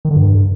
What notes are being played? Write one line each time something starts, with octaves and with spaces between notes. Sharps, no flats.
D#3
D3
G2